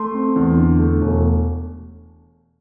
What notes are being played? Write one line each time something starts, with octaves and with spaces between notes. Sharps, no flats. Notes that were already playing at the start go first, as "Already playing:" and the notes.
Already playing: A3 C6
C4
E2
D3
A3
E1